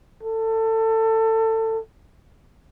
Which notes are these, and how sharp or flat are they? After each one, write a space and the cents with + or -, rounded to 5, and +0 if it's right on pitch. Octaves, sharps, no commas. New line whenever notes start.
A4 +25